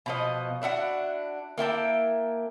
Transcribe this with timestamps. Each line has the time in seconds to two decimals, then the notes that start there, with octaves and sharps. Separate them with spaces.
0.06 B2 F3 D#5
0.62 D4 E4 F#4 F#5
1.58 A#3 E4 G5 A5